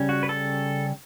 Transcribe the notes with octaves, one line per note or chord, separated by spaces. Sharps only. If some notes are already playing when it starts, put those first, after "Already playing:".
Already playing: C#3 G3 C#4
F#4
B4
A4